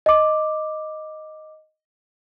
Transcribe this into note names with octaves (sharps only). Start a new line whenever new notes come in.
D#5 D6